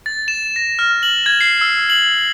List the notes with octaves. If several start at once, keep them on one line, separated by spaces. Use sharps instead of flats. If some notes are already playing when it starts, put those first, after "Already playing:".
A6
E7
A#6
F6
F#7
G#6
C7
E6
F#7